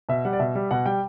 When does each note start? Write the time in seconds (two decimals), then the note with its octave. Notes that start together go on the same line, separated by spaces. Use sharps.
0.09 B2 E5
0.25 G3 F#5
0.33 D5
0.40 B2 E5
0.55 G3
0.71 B2 F#5
0.86 G3 G5